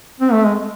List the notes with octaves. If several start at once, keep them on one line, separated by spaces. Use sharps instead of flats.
C4
A3
G#3